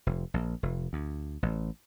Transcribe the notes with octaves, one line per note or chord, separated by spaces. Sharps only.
F1
A#1
F1
D2
A1